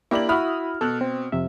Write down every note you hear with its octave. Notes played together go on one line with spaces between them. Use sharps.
A#3 D4 E4 G4 B5 F#7
E4 F#4 B5 D#6 F6
B2 A4 F6 F#6
C4
F2 C3 E5